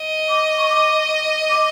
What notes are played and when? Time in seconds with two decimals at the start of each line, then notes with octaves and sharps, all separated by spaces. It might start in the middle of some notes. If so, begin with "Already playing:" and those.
Already playing: D#5
0.29 D6
0.58 C#6
0.69 D6
1.49 D6